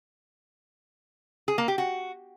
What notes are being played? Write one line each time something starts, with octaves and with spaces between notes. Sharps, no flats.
G#4
A#3
G4
F#4